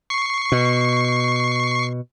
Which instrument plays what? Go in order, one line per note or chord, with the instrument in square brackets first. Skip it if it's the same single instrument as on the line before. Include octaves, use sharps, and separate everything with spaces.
[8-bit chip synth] C#6 C7
[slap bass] B2